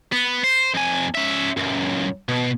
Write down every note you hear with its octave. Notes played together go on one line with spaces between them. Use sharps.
B3
C5
F2 G#5
C#4 E5
C#2 F#2
B2